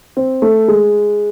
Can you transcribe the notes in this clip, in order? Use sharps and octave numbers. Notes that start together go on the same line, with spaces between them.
C4
A3
G#3